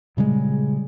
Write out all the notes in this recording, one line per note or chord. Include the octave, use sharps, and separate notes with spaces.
A#2 C#3 G3 G#3